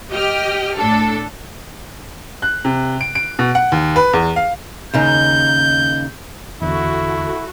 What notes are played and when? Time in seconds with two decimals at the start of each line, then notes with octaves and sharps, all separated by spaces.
0.12 G4 D#5 G5 F6
0.76 A2 D4 A4
2.42 F#6
2.65 C3
3.01 D7
3.15 D7
3.39 B2
3.55 F#5
3.72 D#2
3.96 B4
4.13 E2
4.36 F5
4.94 D#2 C#3 D#4 G6
6.62 E2 D3 E4 F#4 A4